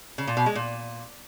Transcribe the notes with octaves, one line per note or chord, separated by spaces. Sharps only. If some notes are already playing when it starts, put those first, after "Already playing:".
C#3
A#2
B2
G#3
A#2